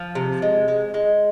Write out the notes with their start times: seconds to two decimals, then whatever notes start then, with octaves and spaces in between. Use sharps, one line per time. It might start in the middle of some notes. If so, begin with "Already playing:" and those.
Already playing: F3
0.15 C3
0.42 G#3
0.68 G#3
0.94 G#3